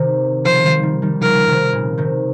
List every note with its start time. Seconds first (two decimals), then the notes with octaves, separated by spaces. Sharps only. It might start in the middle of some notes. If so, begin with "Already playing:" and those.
Already playing: C3 D#3
0.44 C#3 F3 C5
0.63 D#3 G3
0.83 D#3 G3
1.02 D#3 G3
1.21 C#3 F3 A#4
1.46 C3 D#3
1.73 A#2 C#3
1.98 C3 D#3